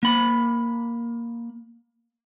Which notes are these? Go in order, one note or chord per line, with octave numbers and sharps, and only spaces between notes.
A#3 B5